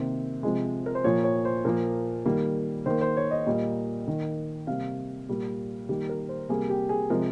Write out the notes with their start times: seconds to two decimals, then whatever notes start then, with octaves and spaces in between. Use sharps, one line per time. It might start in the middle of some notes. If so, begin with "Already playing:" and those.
Already playing: C3 D#3 A#3 C5
0.43 C3 F3 G#3
0.86 A#4
0.95 C5
1.04 A#2 F3 A#3 C#5
1.24 C#5
1.45 C5
1.65 A#2 F3 A#3 A#4
2.26 D#3 G3 A#3
2.86 D#3 A#3 C5
3.01 C5
3.17 C#5
3.31 D#5
3.46 A#2 G3 A#3 D#5
4.07 D#3 A#3
4.67 C3 G3 A#3 F5
5.29 A#2 G3 A#3
5.89 D#3 G3 A#3 G4
6.09 A#4
6.29 C5
6.49 C3 G3 A#3 G#4
6.70 G4
6.89 G#4
7.10 C3 F3 G#3 A#4